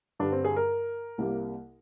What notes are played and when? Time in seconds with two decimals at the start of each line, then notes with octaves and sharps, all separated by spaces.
0.20 G2 D3 G3 D4
0.32 C4
0.45 G#4
0.56 A#4
1.18 C2 C3 G3 A#3